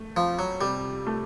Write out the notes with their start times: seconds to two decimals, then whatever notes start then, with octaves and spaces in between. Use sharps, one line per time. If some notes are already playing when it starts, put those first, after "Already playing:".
Already playing: A3
0.16 F2 F3
0.39 F#3
0.61 C3 G3
1.07 A3